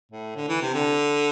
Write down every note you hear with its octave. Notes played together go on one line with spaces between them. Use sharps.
A2
D3
E3
C3
D3